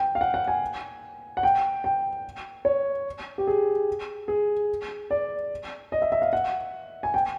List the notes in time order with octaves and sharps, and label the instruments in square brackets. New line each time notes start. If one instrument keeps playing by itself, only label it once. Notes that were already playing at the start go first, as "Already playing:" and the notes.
Already playing: [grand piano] G5
F5
F#5
F#5
G#5
F#5
G5
G5
C#5
G4
G#4
G#4
D5
D#5
E5
E5
F5
F#5
G#5
G5